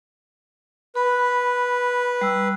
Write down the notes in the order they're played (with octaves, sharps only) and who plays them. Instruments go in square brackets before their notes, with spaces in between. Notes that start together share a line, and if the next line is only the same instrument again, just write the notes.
[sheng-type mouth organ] B4 [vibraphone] B5
[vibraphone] G3 E6